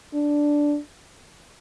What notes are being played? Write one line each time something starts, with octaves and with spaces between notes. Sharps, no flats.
D4